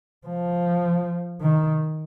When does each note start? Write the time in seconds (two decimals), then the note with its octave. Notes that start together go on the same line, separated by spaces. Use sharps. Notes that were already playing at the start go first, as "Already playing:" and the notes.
0.27 F3
1.41 D#3